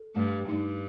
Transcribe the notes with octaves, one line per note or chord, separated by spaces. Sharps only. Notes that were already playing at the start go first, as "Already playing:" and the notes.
Already playing: A4
G2 A3
G2 D#4